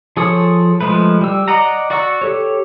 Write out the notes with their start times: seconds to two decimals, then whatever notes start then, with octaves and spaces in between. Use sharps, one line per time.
0.17 F3 G#4 A4 C#5 D#6
0.81 F3 G#3 A3 B4
1.21 G3 E6
1.48 D5 D#5 F#5 A#5
1.90 F#4 D5 F#5 C#6 E6
2.21 G4 A4 C#5